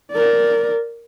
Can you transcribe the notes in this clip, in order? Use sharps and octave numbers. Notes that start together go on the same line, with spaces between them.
A#4 D5